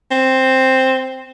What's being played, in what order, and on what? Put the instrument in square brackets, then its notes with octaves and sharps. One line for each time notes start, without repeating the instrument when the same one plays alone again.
[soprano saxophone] C4